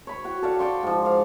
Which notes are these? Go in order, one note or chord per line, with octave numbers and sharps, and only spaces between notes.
C#5 B5
F#4 G5
A4 D5 F5
D5 G5 C6 C#6
G#2 F3
F5 F#5